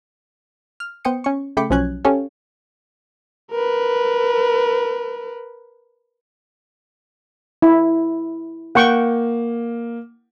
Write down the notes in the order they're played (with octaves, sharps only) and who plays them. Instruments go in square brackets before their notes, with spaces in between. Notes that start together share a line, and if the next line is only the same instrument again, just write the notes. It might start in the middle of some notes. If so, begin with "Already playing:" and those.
[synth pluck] F6
B3 C5 G5 D#6 C#7
C#4 C#6
C#3 A3 G5 B5 D6 C#7
B1 F3 F#3 C#4 F#6 G#6
C#4 G4 A4 C#5 F5
[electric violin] A#4 B4
[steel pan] E4
[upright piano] A#3 [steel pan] F#5 G5 C#6